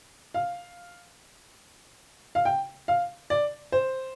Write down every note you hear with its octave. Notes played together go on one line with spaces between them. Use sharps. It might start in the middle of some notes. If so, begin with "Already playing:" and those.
F5
F5
G5
F5
D5
C5